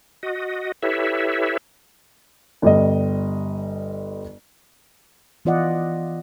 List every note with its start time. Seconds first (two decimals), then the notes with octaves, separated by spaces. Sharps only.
0.23 F#4 D#5
0.83 E4 G4 A4 B4 C#5 E5
2.62 G1 G3 D#5
5.45 E3 B3 F4 D5 D#5 F#5